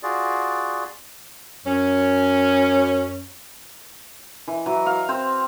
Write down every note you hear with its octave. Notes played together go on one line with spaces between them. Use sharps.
F4 F#4 G#4 D5
F#2 C#4
E3
E3 F#3
F5
C4 C5